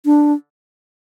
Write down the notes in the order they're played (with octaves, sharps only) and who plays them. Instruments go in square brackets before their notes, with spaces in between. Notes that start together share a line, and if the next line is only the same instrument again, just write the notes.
[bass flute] D4